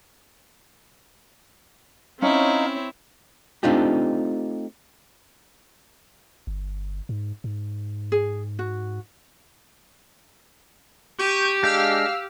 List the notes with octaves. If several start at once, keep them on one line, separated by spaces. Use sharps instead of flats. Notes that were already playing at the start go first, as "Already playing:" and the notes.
C4 C#4 D#4 E4 C#5 F5
A3 C4 D4 D#4 F4 G4
G1
G#2
G#2
G#4
F#4
G4 C#6 G6 D#7
G#3 D4 F5 E6 F6 G6